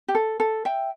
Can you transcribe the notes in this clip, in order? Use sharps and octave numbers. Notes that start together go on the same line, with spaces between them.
G4
A4
A4
E5 G5